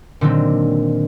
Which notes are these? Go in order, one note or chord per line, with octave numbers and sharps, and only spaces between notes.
A#2 D3 D#3 F#3 C4